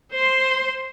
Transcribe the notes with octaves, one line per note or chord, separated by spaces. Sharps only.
C5 C6